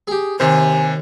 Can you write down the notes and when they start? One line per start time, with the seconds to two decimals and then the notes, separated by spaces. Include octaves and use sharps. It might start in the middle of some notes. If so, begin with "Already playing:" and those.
0.07 G4 G#4
0.40 D#2 C3 C5 G#5